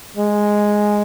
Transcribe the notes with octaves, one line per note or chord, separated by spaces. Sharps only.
G#3